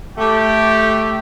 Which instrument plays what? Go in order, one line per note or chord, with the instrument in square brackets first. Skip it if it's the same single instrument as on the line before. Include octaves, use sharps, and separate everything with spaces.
[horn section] A3 G4